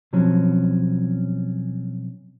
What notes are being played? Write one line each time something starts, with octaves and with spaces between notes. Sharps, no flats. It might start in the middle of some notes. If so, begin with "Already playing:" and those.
B2 F3 F#3 C4 C#4